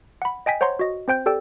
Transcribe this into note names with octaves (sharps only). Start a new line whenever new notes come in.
F#5 B5
D#5 G5 G#5 B6
C5 C#5 F#5 A#5 C6
F#4 D#5
C4 C5 G5 G6
G4 A4 D5 G5 E6